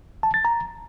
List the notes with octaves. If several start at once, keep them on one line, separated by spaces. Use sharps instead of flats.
A5
A6
A#5